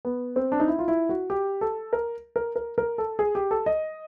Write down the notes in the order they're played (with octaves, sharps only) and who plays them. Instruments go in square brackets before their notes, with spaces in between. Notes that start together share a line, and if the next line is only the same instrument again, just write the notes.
[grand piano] B3
C4
D4
D#4
E4
F4
E4
F#4
G4
A4
A#4
A#4
A#4
A#4
A4
G#4
G4
A4
D#5